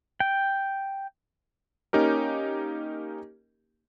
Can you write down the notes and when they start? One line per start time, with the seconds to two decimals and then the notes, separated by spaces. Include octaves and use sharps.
0.20 G5
1.93 A#3 C#4 D#4 G4 A#4